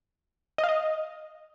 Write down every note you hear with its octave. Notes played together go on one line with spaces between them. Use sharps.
D#5
F5
D#5